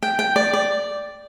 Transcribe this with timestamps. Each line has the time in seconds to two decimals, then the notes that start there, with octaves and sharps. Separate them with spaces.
0.03 G5
0.19 G5
0.36 D5
0.53 D5